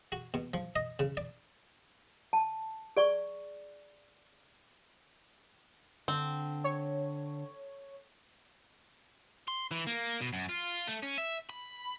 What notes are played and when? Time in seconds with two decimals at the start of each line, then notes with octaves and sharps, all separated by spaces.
0.12 F#4
0.34 B2
0.54 F3
0.76 D#5
0.99 C#3
1.17 D5
2.33 A5
2.97 G#4 D5 C#6
6.08 D3 C4
6.64 C#5
9.48 C6
9.71 E3
9.87 A#3
10.21 B2
10.33 F#2
10.49 F4
10.87 A3
11.02 C#4
11.18 E5
11.50 B5